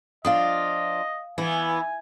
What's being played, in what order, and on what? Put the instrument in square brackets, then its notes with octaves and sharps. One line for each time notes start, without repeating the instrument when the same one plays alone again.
[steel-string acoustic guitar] F3 D4 F4 [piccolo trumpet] D#5 [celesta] F5 D#6
[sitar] E3 B3 [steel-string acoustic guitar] E4 [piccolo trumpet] G#5